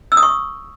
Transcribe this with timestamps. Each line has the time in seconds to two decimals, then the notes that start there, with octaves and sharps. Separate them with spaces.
0.12 E6
0.17 D#6
0.23 C#6